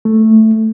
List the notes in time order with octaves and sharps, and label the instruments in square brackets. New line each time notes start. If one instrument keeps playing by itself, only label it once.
[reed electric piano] A3